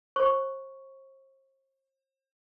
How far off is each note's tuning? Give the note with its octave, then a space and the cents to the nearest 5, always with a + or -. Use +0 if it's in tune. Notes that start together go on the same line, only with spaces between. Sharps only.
C5 +40 C#6 +0